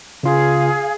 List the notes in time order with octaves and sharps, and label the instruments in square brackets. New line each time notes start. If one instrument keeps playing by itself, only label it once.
[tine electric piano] C#3 F4 [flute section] G#4 F5